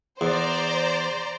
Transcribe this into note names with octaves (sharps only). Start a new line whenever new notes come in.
E2 C5 D5 A#5